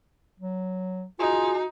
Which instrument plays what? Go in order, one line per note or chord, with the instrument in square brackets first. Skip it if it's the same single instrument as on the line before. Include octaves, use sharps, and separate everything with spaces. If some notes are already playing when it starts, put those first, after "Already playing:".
[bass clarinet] F#3
[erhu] D#4 [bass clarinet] F4 [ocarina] F#4 [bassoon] G#4